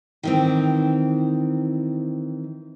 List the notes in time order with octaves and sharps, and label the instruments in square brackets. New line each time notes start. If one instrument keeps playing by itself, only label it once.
[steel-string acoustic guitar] D#3 E3 C4